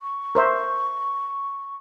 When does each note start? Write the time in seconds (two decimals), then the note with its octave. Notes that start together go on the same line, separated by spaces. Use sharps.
0.02 C#6
0.35 A#4 C5 E5